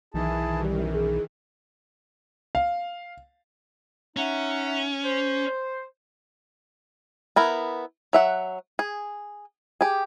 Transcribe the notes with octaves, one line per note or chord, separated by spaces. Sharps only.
B1 D#3 E3 E4 G#4 A5
F#2 G3
G#4
F5
C#4 D#4 E5 F#5
C5
B3 E4 A#4
F#3 E5 F#5
G#4
G4 G#4